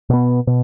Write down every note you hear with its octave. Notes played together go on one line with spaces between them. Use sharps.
B2 B3
B2